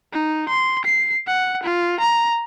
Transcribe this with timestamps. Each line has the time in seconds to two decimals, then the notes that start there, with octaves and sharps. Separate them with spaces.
0.12 D#4
0.49 C6
0.85 C7
1.27 F#5
1.63 F4
2.00 A#5